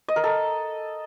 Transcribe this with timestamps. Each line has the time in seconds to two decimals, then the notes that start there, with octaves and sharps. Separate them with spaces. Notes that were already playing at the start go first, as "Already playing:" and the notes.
0.08 D#5
0.16 A#4
0.24 A4